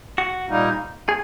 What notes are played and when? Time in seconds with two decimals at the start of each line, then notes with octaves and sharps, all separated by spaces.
0.18 F#4
0.48 A#2 G3 A#3 D#4
1.09 G#4